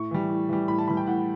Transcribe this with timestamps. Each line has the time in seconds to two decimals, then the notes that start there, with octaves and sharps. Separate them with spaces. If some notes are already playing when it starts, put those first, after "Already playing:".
Already playing: A2 C#6
0.11 E3 G3
0.30 A2
0.49 E3 G3
0.68 A2 B5
0.78 A5
0.88 E3 G3 B5
0.97 G5
1.07 A2 F#5